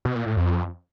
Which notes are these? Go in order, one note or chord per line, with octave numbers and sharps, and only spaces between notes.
B2
A#2
A2
F2
F2